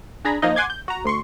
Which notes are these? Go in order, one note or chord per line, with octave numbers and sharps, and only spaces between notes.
D4 G#4 A#5 B5
F3 A#3 D#4 D#5
F#5 G#5 C6 D6 G#6
G6
F#4 A#5
D2 C6 C#6